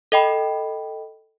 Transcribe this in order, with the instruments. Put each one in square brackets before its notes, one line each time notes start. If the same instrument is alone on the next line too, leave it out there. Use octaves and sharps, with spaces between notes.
[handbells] A4 D#5 G5 B5